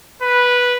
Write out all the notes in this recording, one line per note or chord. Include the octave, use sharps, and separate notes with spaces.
B4